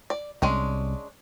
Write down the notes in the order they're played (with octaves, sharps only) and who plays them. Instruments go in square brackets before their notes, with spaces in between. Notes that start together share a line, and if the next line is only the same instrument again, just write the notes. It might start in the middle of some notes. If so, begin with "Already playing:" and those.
[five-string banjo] D5
[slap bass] C2 [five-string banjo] G#3 C#4 D4